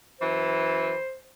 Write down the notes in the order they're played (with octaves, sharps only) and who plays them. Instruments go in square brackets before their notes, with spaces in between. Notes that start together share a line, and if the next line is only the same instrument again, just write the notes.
[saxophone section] F#2 E3 [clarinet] C5